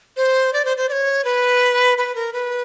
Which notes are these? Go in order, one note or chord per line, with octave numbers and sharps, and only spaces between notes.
C5
D5
C5
C5
D5
C#5
B4
B4
A#4
B4